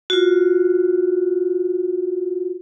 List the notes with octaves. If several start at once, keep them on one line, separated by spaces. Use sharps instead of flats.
F4 F#4